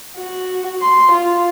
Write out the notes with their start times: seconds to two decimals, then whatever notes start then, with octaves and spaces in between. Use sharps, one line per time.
0.17 F#4
0.82 C6
1.12 F4